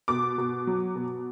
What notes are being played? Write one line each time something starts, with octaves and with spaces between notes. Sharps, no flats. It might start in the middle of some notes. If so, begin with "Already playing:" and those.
B2 D6
B2
F#3
B2